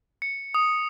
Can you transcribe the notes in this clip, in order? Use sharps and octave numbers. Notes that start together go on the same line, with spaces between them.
C#7
D#6